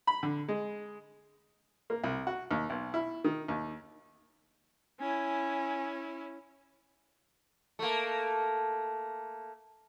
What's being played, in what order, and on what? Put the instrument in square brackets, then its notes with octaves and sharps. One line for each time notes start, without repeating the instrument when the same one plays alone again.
[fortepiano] B5
D3
G#3
A#3
C2
F#4
D#2
B1
E4
D#3
D#2
[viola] C#4 E4 [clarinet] G#5
[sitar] A3 A#3